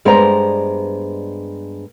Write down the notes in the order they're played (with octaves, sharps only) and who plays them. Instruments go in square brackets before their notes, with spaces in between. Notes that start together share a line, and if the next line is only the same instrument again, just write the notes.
[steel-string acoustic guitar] G2 G#3 B3 C5 D5 A#5